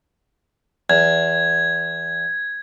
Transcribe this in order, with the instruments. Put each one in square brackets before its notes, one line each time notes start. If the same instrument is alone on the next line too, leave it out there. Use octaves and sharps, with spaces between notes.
[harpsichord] E2 [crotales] G#6